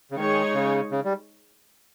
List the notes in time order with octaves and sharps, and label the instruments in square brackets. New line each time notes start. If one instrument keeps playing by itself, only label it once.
[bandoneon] C#3
[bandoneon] D#3 [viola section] G#3 D#4 G#4 C#5
[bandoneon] C#3
C#3
G3